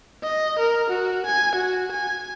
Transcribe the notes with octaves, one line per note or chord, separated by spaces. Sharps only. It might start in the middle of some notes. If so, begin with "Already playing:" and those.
D#5
A#4
F#4
G#5
F#4
G#5